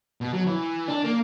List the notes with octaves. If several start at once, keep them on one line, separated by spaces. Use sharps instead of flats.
B2
F#3
E3
D4
A#3